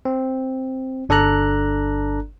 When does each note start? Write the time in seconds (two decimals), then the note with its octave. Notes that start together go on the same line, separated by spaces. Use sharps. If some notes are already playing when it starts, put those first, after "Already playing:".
0.05 C4
1.09 G1 D4 A4 D5 A#5 F#6